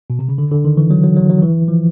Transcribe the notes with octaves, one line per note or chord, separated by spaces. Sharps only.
B2
C3
C#3
D3
D3
D#3
E3
F#3
F#3
F#3
F#3
E3
F3